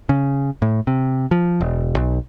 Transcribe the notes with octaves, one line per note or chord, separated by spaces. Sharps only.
C#3
A2
C3
F3
E1
B1